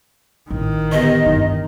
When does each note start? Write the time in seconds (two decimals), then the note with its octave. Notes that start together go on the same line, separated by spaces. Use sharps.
0.50 A1 D#3
0.92 D3 B3 G4 D#5
1.26 G2 E3 D#4